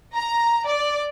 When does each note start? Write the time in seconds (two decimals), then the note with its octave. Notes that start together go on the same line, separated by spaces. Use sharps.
0.14 A#5
0.66 D5